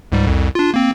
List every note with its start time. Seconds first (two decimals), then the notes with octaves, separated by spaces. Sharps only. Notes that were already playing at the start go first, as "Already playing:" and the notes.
0.12 C#2 G#2 G3
0.27 C2 F2
0.55 D4 F4
0.74 A#3 C4